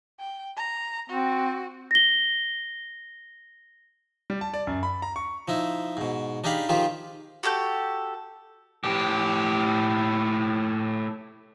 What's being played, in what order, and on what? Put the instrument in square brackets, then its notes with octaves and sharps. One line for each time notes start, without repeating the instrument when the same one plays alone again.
[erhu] G5
A#5
[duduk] C4 [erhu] F#4
[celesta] A#6 G7
[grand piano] G3
A5
D5
F#2
B5
A#5
C#6
[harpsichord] F3 D#4 E4
G#2 B2
D4 D#4 G4 G#4 F5 B5
D#3 F3 F4 G4 G#4
[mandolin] F#4 G4 A4 G6
[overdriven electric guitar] A2 G4